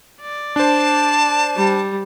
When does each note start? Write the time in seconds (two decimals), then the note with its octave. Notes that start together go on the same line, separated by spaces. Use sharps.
0.21 D5
0.56 D4 C5 A5
1.56 G3